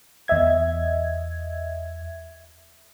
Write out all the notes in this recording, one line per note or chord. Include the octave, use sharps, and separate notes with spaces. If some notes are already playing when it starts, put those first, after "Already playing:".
E2 D#5 E5 G#6